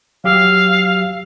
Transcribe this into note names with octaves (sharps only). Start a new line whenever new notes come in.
F#3 G4 F5 E6